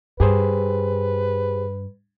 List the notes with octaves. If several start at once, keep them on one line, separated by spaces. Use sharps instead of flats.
G2 G4 G#4 B4 C5